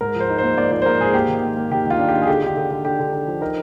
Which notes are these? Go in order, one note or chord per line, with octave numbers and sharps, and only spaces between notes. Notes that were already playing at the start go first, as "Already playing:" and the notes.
G#2 A#4
F3
C5
D#4
A#3 C5
A#3 D5
F3 C5
C5
A#3 A#4
G#2 G#4
A#3 G4
D#3
A#3
A#3
D#3 G4
D#3 F4
D4
G4
D#3
G#4
D3 G4
D3 G4
D3
D3
D3 G4
D3
D3
F3
D#4 A#4